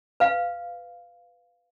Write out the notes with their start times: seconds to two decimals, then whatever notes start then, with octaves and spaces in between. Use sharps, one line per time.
0.20 B4 F5